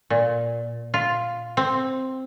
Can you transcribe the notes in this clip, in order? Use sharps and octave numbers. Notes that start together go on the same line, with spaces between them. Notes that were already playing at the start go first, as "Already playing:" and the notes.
A#2
F4
C4